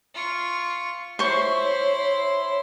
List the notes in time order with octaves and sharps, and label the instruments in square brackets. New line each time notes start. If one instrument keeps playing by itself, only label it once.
[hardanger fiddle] F4 C#6
[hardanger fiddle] E4 C6 [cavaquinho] C5 C#6 [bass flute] C#5